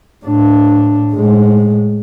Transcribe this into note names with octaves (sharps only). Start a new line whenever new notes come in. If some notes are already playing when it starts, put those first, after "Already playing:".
A2 D4
A2 G#3